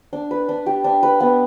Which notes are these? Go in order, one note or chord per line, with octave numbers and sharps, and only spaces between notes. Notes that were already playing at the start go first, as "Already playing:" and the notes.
D4
B4
D4
G4
D4
B4
B3